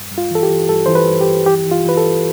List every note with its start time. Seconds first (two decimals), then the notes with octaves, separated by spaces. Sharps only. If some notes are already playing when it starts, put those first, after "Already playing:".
Already playing: G2
0.11 G2
0.18 F4
0.31 E3 A4
0.43 G4
0.50 E3
0.69 G2 A4
0.86 E3 C5
0.95 B4
1.08 G2
1.21 G4
1.27 G2
1.46 E3 G4
1.66 E3
1.72 F4
1.85 E3 B4
1.97 A4
2.04 G2